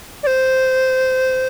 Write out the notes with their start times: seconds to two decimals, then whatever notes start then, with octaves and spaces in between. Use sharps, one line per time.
0.23 D5
0.27 C5